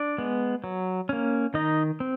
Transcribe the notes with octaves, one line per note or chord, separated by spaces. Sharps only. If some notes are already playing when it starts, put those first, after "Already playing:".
Already playing: D4 D5
G#3 B3
F#3
A#3 C#4
D#3 D#4 D#5
C4